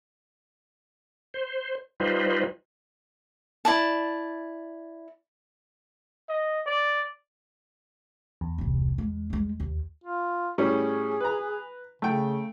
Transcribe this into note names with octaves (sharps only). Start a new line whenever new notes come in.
C5
G3 D#4 F4 B4 C5
E4 D5 A5
D#5
D5
E2
D1 C2
G#3
G3 G#3
D#2
F4
A2 G3 C#4 G#4
B4 A#5
C#3 A3 G5